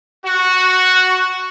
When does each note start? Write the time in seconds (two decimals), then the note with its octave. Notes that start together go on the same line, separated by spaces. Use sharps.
0.25 F#4